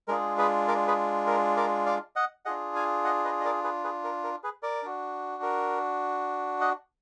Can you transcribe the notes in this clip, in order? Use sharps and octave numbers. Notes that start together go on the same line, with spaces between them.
G#3 D4 F4 G#4 A#4
G#4 B4
A#4 D5
G#4 B4
A#4
A#4 D5
D5 F5
D#5 F#5
D4 F4 G#4 D#5 F#5
F5 G#5
D#5 F#5
B4 D#5
D#5
A#4 D5
G#4 B4
G#4 B4
A#4
A#4
G#4 B4
A#4 D5
D4 F#4
A#4
D#5 F#5